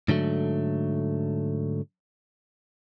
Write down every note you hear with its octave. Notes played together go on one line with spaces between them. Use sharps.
G#2 D3 F#3 A3